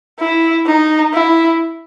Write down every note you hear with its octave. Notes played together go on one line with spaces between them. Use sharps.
E4
D#4
E4